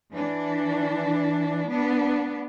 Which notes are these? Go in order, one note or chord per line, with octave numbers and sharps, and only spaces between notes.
E3 D4
B3 D4